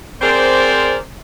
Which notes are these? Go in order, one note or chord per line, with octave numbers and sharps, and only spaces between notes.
C4 G#4 A#4 C5 D5